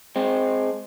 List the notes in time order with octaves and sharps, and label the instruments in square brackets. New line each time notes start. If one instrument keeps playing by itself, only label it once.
[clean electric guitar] G#3 C4